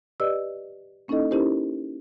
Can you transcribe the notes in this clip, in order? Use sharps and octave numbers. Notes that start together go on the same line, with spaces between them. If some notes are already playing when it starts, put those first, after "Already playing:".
G4 B4 D5 D#5 E6
A#3 C#4 D#4 E4 A4 D#5
C#4 D#4 E4 G4 A#4 C5